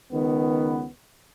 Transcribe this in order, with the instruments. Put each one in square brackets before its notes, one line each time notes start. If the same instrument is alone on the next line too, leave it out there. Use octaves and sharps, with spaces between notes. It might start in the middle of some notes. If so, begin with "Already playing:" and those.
[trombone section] C#2 D#3 B3